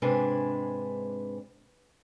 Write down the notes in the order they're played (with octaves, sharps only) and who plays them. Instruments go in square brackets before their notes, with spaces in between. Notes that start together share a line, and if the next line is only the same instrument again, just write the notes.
[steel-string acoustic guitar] G#2 C3 G#3 D4 B4 G#5